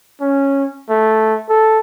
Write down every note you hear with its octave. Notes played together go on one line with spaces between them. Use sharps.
C#4
A3
A4